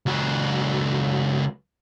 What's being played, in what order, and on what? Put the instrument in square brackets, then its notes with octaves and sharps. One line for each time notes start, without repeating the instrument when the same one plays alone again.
[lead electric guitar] C#2 F#4